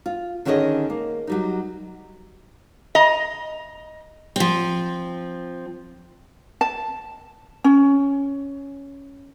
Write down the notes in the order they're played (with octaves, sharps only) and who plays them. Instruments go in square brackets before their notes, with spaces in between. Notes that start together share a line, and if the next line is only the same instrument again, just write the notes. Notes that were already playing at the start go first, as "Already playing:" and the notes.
[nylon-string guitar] F4
D3 D#3 C#4 E4 G#4 D#5
A#3
F#3 G3 D#4
[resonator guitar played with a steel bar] D#5 A#5
[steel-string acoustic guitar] F3 C4
[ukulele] A5
C#4